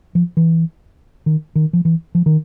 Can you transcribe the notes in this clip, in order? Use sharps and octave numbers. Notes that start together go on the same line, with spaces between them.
F3
E3
D#3
D#3
F3
E3
F3
D#3